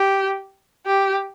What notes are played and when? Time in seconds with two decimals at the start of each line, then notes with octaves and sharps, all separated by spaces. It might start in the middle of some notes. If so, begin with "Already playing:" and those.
Already playing: G4
0.86 G4